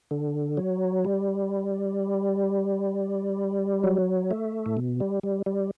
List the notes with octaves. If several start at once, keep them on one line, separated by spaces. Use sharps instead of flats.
D3
F#3
G3
F#3
A3
A2
B2
G3
G3
G3